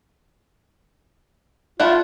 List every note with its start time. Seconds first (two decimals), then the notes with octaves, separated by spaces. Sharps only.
1.80 A3 E4 F4 F#5